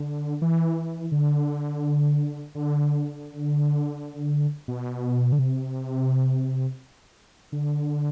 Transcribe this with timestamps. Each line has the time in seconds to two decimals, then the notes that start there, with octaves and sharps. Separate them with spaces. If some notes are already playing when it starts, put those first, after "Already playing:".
Already playing: D3
0.42 E3
1.12 D3
2.55 D3
4.68 B2
5.32 D3
5.39 C3
7.52 D3